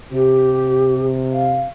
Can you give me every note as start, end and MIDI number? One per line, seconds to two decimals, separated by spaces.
0.12 1.69 48
0.12 1.06 67
1.33 1.63 77